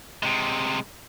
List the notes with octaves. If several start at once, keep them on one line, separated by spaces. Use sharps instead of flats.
C3 G#3